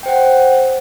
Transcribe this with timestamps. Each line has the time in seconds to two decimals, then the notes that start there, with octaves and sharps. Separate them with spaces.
0.03 G5
0.06 C5
0.08 F#5